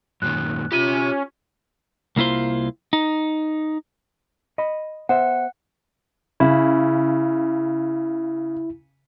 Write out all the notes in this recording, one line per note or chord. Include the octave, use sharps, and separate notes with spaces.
F#2 A#2 D#3 F#6
C#4 F4 G4 E5 D#7
C2 A#3 E4 F4 C5
D#4
D#5 B5
B3 C5 E5 F#5
C#3 E4